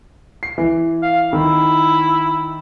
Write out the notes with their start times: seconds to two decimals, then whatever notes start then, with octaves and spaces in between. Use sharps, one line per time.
0.43 C7
0.58 E3
1.03 F5
1.33 D#3 E4